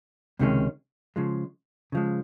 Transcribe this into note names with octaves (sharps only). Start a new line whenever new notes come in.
C#2 C3 D#3 G#3 C#4
C#3 F3 G#3
C#3 F3 G#3